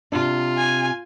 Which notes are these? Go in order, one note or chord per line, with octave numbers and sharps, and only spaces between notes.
C3 D4 F4
G#5